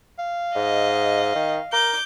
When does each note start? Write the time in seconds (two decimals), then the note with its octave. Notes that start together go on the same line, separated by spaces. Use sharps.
0.19 F5
0.55 G#2 D#5
1.35 D#3
1.73 A#4 D6 G6